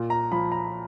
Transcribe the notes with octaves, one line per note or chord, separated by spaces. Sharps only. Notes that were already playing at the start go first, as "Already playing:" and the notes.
Already playing: A#2
A#5
F3 B5
A#5